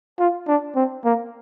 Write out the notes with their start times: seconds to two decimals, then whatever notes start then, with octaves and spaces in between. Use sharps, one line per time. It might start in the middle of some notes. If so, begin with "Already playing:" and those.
0.19 F4
0.48 D4
0.76 C4
1.05 A#3